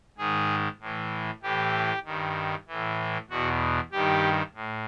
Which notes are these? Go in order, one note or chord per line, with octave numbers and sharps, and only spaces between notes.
G#2 D#3 G#4
A2 E3
A2 E3 G4
G2 D#3
A2 E3
E2 B2 F#4
G2 D#3 G4
A2